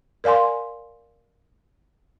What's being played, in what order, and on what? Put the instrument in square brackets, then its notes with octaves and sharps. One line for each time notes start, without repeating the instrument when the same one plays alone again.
[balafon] A#4 D5 F5 G#5 C6